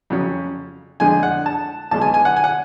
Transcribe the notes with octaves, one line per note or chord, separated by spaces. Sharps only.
F2 C#3 F#3 C#4
F2 D3 G#3 D4 G#5
F#5
A5
B1 B2 G#3 A5
G#5
G#5
F#5
G#5
F#5